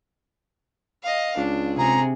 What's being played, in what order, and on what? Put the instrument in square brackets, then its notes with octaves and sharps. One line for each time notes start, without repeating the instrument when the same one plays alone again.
[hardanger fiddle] D#5 F5
[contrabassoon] C#2 [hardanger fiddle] D4
[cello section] C3 [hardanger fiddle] G#4 [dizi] A#5